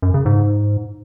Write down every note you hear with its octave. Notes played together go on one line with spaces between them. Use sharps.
F#2
C#3
G#2